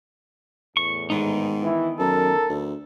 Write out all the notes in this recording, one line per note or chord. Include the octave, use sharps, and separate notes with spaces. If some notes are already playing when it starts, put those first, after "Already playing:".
E2 A2 C#6
G#2 D#3 B3 D#4
E3 E4
F#2 A4 A#4
D2